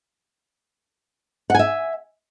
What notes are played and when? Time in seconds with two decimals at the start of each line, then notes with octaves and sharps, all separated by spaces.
1.50 F#5
1.55 G#5
1.59 E5